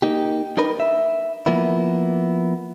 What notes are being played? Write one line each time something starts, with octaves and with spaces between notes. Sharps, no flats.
A#3 D#4 G4
D4 D#4 A#4 B4
E5
F3 A#3 B3 E4